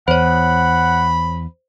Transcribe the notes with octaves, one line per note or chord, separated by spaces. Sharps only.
E2 C5 C#5 F#5 B5